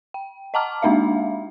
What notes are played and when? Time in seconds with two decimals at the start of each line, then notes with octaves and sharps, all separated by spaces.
0.14 G5
0.54 D#5 F#5 A5 A#5 D6 F6
0.82 G#3 A#3 D4 D#4 E5 F5